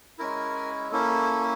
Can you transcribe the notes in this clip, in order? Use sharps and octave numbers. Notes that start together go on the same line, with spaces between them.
G#3 C#4 E4 A#4
A#3 C#4 E4 A4